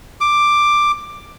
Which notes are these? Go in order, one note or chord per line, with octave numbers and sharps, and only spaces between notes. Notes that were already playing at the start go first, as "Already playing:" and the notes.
D6